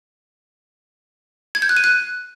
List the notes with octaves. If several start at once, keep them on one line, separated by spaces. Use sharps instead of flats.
G#6
G6
F#6
D#7
F#6